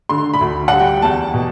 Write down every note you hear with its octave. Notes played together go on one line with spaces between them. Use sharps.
D3 C6
B5
D2
G3 F#5
G5
E2 A5
B2